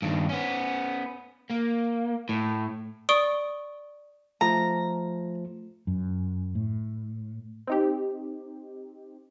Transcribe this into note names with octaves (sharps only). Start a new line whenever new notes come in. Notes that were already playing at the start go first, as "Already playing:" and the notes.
G2 D#3
B3 C#4
A#3
A2
D5 C#6 D#6 D7 G7
F3 A3 A#5
F#2
A2
C4 D#4 G4